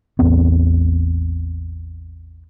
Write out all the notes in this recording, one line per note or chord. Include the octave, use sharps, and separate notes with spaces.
A1 E2 B3 C4